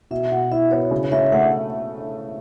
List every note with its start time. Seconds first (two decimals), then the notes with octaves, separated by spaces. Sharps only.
0.11 B2 E5
0.31 B2 F#5
0.51 E4 E5
0.71 B3 C#5
0.91 C#3
1.03 C#5
1.12 C#3 E5
1.27 E5
1.32 A3 F#5